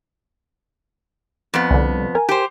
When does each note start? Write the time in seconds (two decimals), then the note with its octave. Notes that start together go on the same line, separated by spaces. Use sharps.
1.54 F2 B3
1.71 C2 D3
2.15 A#4 G#5
2.29 G4 C5